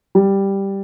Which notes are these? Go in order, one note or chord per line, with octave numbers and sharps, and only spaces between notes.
G3